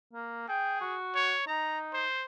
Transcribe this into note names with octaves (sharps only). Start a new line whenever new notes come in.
A#3
G#4 G5
F#4
C#5
D#4 A#5
C5